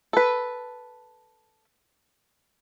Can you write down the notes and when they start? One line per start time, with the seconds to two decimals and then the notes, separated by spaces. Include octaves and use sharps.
0.13 A4 B4